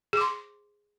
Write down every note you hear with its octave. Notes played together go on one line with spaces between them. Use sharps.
G#4 C6 D6